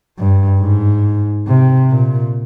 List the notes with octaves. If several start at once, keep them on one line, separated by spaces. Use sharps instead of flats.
G2
G#2
C3
A#2